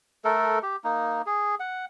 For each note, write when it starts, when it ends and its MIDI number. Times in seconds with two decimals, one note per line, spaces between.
0.25 0.59 57
0.25 0.59 69
0.25 0.59 70
0.63 0.76 67
0.84 1.22 58
0.84 1.22 63
1.26 1.55 68
1.60 1.85 78